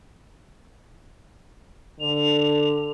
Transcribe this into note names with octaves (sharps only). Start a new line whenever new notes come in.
D3 F7